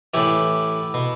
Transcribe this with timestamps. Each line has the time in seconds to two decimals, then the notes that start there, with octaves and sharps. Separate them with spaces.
0.14 A2 E3 E4 G4
0.94 B2